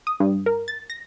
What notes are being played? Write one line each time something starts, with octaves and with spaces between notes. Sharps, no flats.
D#6
G2
A#4
A6
A#6